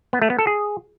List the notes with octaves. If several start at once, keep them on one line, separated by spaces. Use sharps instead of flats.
B3
A3
B3
A4
G#4